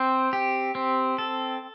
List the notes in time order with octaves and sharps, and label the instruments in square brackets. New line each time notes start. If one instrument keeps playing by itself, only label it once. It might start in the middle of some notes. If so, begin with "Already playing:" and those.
Already playing: [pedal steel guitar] C4 C5
G4
C4
A4